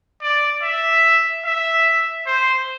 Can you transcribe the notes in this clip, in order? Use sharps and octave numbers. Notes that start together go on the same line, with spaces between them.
D5
E5
E5
C5